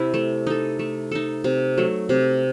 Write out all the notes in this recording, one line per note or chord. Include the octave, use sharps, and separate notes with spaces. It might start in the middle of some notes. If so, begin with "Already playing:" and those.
Already playing: C3 E4
A3
D#4 A4
A3
D#4 A4
C3
F#3 A3
C3